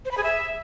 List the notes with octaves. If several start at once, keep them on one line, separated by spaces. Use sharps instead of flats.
C5
B5
G#4
E5